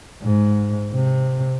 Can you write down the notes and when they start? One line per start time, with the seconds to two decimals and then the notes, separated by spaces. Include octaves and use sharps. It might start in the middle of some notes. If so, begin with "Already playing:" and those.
0.23 G#2
0.93 C3